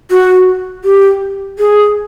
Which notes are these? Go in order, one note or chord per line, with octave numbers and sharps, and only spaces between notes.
F#4
G4
G#4